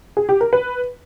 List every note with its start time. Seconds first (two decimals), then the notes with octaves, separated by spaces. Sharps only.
0.17 G#4
0.29 G4
0.41 A#4
0.53 B4